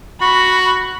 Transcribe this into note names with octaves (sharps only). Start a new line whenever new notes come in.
F#4 B5